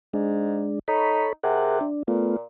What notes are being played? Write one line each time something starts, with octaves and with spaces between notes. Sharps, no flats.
G#2 G#3 D4
D#4 A4 C#5 B5
C3 G#4 A#4 F#5
D4
A#2 A3 B3 F4